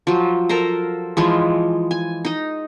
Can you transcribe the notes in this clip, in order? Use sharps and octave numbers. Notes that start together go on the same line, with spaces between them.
F3 F#3
A4 A#4 C5 A#5
E3 F3 G#3
G#5
D#4 D#5